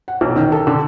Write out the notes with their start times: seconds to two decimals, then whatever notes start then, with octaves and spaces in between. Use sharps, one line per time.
0.08 F#5
0.21 B1
0.36 D#3
0.52 A4
0.67 D3